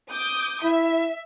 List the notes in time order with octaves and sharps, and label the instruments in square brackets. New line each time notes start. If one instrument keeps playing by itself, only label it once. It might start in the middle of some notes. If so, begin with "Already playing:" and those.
[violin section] D6 D#6 G6
[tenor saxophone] E4 [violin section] E5